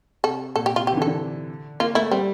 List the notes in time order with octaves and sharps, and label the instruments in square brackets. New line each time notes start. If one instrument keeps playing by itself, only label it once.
[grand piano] C3 [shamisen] A4
[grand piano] A#2 [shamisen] A4
[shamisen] G4
[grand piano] C3
[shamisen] F4
[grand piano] C3 [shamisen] G4
[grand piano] E3
D3
[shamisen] A4
[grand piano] D3
[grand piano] A#3 [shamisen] F4
[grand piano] A3 [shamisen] E4
[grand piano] G3 [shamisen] C4